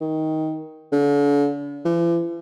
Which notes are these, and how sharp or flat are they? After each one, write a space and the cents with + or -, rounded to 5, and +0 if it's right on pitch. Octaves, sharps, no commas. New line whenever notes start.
D#3 +15
D3 -40
E3 +45